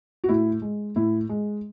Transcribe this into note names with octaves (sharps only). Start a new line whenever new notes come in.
F#4
A2 E4
G#3
A2 E4
G#3